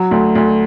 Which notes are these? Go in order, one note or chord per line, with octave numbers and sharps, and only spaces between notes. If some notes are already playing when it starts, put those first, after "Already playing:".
Already playing: F#3
D2
D2